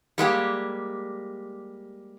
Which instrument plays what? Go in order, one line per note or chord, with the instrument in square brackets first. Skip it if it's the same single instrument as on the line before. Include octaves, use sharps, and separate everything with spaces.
[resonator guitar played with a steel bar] G3 G#3 A#3 G4